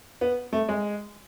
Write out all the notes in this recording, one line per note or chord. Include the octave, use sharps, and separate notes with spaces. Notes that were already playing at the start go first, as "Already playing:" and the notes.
B3
A3
G#3